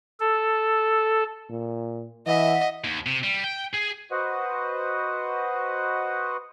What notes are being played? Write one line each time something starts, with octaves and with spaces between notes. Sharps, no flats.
A4
A#2
E3 D#5 E5 F#5
D#2
C3
G3
G5
G#4
F#4 B4 C5 D#5 F#5